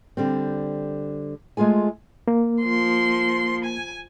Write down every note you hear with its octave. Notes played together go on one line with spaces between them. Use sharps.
D3 G3 C4
G#3 A3 F4 G#4 G#5
A#3
F3 C6
G#5